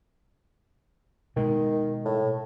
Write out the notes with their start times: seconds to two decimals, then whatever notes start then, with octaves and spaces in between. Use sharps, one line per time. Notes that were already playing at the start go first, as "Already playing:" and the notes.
1.36 B2 D#3 G#3
2.05 A2